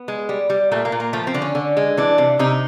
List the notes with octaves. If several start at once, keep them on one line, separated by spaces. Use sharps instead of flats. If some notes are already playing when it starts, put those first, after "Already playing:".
Already playing: B3
G#3
G3
G3
A#2 A3
A#3
A#2
A#3
F3 A3
C4
D3
C#4
D3
G#3
E3 D4
C3
C3 D#4